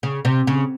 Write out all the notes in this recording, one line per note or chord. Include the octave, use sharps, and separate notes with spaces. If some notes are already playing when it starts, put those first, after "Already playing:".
C#3
C3
C#3